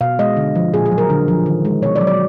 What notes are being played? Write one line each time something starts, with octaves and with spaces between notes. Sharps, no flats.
B2 F5
G#3 D#5
D3
F3
A#2 G#4
G#4
F#3
A#4
D3
F3
D#3
G#3
B2 C#5
D5
F#3
D5